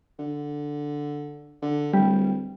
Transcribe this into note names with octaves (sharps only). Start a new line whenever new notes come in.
D3
D3
D1 G3